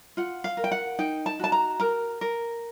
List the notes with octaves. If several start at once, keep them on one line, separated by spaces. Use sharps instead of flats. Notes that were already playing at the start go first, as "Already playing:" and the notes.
F4 F#5
F5
A#4
G5
F#5
D#4 G5
A5
F#4 A5
A#5
A#4 A#5
A#4